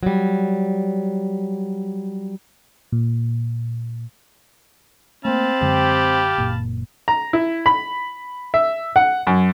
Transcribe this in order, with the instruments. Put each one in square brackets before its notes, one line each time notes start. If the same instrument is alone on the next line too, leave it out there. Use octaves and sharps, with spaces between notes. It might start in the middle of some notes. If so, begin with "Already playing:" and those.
[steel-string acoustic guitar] F#3 G3
[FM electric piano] A#2
[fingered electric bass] A3 A#3 [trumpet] C4 [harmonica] F5 A5 B5
[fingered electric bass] F#2 D3 G#3 [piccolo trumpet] G4
[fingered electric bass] F#1 A#2
[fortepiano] A#5
E4
B5
E5
F#5
F#2